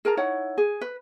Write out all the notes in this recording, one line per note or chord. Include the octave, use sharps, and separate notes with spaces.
G#4 A#4 A5 A#5
D#4 E4 C#5 F#5
G#4
B4